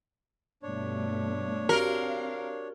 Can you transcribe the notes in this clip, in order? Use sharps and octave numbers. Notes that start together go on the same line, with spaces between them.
G2 B2 A3 D4 C#5
C4 F#4 G4 A#4 F5